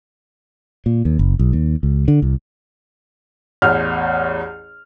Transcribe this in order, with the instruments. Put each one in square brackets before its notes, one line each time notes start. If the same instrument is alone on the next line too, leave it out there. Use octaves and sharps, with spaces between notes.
[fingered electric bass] A#2
D#2
F#1
B1
D#2
C#2
D3
C2
[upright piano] A1 E2 F6